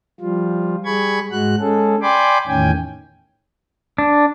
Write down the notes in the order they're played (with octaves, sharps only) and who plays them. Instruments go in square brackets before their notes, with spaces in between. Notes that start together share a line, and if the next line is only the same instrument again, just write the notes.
[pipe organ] F3 G3 F4
G3 G#4 B5 C#6 G#6
G#2 G#3 F#4 F#6
G#3 C#4 G#4 A4
D5 G5 G#5 B5 C6 D6
E2 A2 D#3 C#4 G5 G#5
[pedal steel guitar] D4